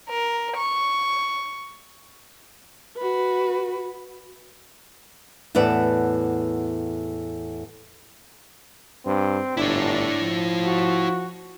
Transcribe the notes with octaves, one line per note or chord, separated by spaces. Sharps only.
A#4
C#6
F#4 B4
E2 A2 B4 D5 F#5 A5
G2 C4
G1 D4 E4 C#5
F3
F#4